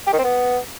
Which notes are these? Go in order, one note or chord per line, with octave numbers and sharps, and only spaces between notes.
G4
D#3
C4
B3